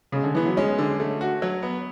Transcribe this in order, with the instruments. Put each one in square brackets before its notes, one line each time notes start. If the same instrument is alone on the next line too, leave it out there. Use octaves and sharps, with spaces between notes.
[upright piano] C#3 [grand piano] G#3
[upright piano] D3
[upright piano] E3 [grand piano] B3
[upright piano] F#3
[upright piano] G#3 [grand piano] C#4
[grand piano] D3
A3
F#4
F#3
B3